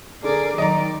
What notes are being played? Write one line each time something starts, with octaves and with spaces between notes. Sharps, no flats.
D3 G#4 A#4 D5
D#3 F#3 D5 D#5 A#5